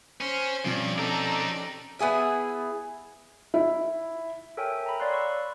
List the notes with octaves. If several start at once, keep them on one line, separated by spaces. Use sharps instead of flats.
C#4 C5
G2 B2 F3 C4 C#4 D5
D#4 G4 A4 A#5
B3 E4 G#4 E5
E4
A4 A#4 C#5 E5 G5 G#5
A#5 B5
C#5 D5 F5 B5 C6 F#6
B5 C#6 E6